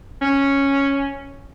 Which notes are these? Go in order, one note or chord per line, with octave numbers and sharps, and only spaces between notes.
C#4